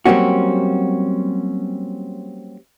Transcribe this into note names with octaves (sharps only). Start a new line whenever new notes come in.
F#3 G3 A#3 C4 C#4 F#4